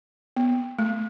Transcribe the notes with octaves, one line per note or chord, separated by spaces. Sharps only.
B3
A3